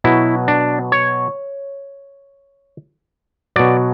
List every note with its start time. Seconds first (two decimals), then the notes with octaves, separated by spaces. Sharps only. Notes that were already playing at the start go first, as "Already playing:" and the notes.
0.04 B2 F#3 E4
0.48 D4
0.92 C#5
3.56 B2 F#3 D5